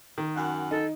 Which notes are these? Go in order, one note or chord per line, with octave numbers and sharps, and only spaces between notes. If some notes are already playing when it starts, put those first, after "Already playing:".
D#3
F#2 F#5
D#4 A4